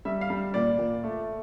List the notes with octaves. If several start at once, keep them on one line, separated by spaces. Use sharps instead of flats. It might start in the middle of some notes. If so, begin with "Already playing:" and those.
G3 E5
F5
G3
A#2 D5
A#2
A3